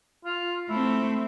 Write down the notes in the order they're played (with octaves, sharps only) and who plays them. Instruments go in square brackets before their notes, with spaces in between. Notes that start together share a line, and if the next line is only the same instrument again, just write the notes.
[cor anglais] F4
[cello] A3 C4 [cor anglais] E4